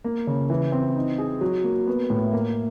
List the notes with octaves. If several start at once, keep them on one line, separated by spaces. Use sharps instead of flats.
A#3
C#3
E3
C4
D#4
G#4
F#3
A#3
B3
A2
A#3